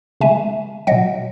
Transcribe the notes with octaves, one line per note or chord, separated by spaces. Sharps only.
C#3 G#3 E5 G#5
B2 F#3 D#5 F#5